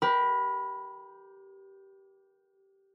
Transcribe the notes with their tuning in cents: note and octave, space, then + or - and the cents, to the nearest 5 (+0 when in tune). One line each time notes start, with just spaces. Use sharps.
G4 -10 A#4 +40 B5 +0